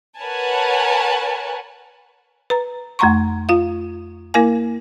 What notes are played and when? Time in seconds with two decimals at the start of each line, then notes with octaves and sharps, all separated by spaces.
0.18 A#4 B4 C#5 F#5 G#5 A5
2.50 B4 A#5
2.99 F2 A3 F#5 A#5 C6 C#6
3.49 F4 F5
4.34 A#3 E4 A#4 F5 G#5